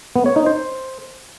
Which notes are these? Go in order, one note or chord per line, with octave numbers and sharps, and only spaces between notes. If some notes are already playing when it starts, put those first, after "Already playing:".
B3
C#5
D#4
C5